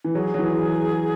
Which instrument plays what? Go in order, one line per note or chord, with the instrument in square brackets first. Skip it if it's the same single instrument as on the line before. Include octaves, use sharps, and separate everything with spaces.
[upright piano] E3
[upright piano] F#3 [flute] G#4
[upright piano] F#3
E3